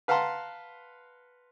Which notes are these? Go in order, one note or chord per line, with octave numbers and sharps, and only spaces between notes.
B4 F5 F#5 A5 A#5 C6